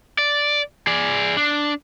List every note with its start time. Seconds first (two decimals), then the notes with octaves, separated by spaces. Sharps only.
0.18 D5
0.87 G#4 D5
1.37 D4